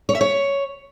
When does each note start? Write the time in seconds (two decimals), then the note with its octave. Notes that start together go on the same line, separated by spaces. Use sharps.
0.09 C#5
0.15 E5
0.21 C#5